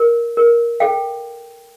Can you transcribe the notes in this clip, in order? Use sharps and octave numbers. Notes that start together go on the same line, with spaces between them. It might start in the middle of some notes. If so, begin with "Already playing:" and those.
Already playing: A#4
A#4
A4 F5 G5